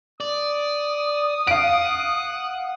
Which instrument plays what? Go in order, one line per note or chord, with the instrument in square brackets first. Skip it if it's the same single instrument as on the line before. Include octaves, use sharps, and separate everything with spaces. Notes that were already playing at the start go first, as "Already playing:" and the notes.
[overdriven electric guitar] D5 [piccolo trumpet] D#6
[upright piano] F5 D7 [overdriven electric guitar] F#5